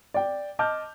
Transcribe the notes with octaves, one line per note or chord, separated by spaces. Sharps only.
D5 G5
D#5 A5 D6 F6 G6